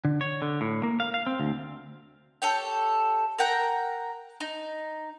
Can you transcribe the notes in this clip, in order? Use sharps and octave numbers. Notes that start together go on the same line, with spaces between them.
D3
C#5
D3
A2
A#3
F5
F5
C4
D2
G4 A4 C#5 G5
A#4 F#5 G5 A#5
D#4